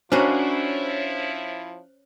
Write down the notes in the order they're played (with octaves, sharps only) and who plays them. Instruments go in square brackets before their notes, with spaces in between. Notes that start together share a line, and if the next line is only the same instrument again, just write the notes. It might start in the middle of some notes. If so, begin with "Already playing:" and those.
[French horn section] F3 E4 [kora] C#4 [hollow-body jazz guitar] D4 F#4 A#4 [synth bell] C5 C#5